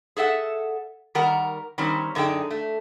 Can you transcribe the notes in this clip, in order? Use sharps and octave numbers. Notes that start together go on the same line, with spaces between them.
G#4 A4 E5 F#5
D#3 G3 A#4 F#5
D#3 G3 C4 C#4
F#2 D3 D#4 G#4 G5
A3